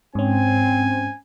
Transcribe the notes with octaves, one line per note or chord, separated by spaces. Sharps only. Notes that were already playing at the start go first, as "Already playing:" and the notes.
G#2 C4 C#4 G#5